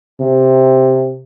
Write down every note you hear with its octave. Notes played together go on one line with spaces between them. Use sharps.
C3